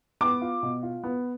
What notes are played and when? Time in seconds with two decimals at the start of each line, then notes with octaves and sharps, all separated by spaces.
0.21 B3 D6
0.41 F4
0.63 B2
0.83 F4
1.03 B3